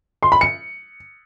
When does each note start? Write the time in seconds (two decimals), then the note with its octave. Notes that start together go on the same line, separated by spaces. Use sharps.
0.23 C6
0.32 B5
0.41 C#7